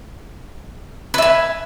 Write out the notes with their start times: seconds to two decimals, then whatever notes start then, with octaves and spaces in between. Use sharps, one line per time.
1.14 B4
1.18 E5
1.22 G#5